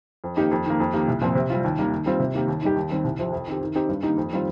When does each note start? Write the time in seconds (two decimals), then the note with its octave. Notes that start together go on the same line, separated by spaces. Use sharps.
0.24 F2
0.37 D#3 A#3 D#4 G4
0.51 F2
0.66 D#3 A#3
0.80 F2
0.93 D#3 A#3 G4
1.08 C2
1.21 A#2 F3 C4
1.35 C3
1.50 G3 C4 F4
1.64 D#2
1.78 D#3 G3 A#3
1.93 D#3
2.06 G3 C4 F4
2.20 C3
2.34 D#3 A#3 G4
2.48 D#2
2.62 D#3 G3 D#4 G4
2.76 D#2
2.91 D#3 G3 C4
3.04 C2
3.19 C3 F3
3.32 F2
3.47 D#3 C4 G4
3.61 D#3
3.75 C4 D#4 G4
3.89 G2
4.03 D#3 A#3 D#4 G4
4.17 F2
4.32 D#3 G3 C4 F4